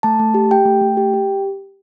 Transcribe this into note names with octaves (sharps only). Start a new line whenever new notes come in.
A3 A5
A3
G4
G4 G5
A3
A3
G4
G4